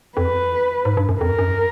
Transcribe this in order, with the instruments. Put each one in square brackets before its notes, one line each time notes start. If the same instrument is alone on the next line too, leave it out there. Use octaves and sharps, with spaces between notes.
[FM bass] F2 [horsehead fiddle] B4
[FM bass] G#2
G2
F#2
[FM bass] F2 [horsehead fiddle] A#4
[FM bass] F#2